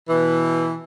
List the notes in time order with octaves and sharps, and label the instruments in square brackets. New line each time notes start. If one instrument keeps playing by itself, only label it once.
[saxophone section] B2 E3